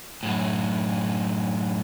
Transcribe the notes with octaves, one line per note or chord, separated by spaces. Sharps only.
F#2 A2